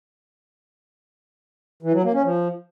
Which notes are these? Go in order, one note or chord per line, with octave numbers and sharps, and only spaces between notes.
E3
F#3
A#3
C#4
F3